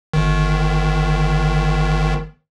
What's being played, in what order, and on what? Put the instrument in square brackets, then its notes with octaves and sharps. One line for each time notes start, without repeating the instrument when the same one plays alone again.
[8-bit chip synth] G1 D#3